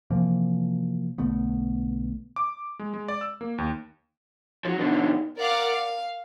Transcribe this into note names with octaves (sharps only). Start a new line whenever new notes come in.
C3 E3 F3 A#3
B1 D3 A3 B3
D6
G#3
G#3
D5
E6
A#3
D#2
F3 F#3 C#4 D#4 G#4
B2 D3
G4 F5
A#4 D5 F5 F#5 D6 F6
F5